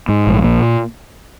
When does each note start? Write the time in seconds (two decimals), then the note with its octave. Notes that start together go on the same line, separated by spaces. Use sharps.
0.09 G#2
0.27 A#1
0.44 A#2